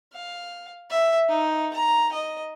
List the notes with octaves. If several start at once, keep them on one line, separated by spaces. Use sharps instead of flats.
F5
E5
D#4
A#5
D#5